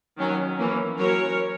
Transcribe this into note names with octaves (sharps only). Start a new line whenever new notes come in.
D#3 F#3 C#4
E3 A#3 C#4
F#3 C#4 A#4 C#5